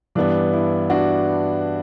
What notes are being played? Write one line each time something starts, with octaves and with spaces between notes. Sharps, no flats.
G2 E3 B3 D4
E4
D4 F#4